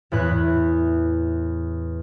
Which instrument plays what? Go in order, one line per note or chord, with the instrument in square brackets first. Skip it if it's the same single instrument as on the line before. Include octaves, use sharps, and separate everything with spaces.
[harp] E2 A2 B4 F#6 G#6